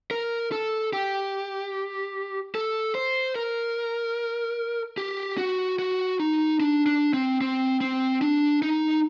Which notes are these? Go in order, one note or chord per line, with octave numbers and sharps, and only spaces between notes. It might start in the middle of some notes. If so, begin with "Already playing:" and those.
A#4
A4
G4
A4
C5
A#4
G4
F#4
F#4
D#4
D4
D4
C4
C4
C4
D4
D#4